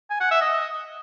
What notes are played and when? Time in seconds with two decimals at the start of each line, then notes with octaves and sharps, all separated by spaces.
0.10 G#5
0.21 F#5
0.31 E5
0.41 D#5